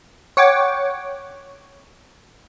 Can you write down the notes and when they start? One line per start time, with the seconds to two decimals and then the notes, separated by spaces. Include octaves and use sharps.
0.37 C#5 F#5 G5 D6